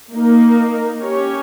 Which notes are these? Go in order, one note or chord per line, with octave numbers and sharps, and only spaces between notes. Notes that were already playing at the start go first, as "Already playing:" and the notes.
A#3 D#4 A#4
C#4 G4 C#5